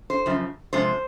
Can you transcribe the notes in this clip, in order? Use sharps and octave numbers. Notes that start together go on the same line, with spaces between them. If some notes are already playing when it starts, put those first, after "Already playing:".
C5
F#2 C#3 F3
C3 F3 G#3 C5